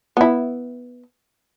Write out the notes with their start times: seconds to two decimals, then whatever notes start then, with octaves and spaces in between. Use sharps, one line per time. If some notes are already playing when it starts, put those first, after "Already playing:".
0.17 B3 E4